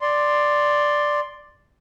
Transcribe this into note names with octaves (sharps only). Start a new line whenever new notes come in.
D5 C6